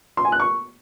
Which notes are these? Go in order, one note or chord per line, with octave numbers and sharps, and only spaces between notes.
C6
G#5
F#6
C#6